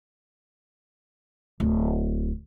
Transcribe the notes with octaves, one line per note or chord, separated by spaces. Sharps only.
D1